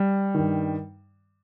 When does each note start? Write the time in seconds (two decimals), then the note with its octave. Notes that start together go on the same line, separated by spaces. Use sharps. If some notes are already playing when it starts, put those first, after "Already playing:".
Already playing: G3
0.35 G2 D#3